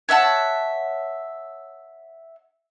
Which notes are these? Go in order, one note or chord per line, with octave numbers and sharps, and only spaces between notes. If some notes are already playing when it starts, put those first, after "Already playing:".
C#5 E5 F#5 A5